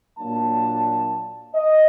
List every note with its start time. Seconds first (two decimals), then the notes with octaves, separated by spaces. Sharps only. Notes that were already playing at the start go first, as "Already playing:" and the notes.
0.17 A#2 F#3 A#3 D4 A5
1.55 D#5